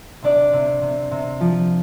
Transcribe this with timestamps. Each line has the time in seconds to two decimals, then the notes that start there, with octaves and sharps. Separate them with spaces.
0.22 C3 D4 D5
0.53 C3
0.82 C3
1.11 C3
1.40 F3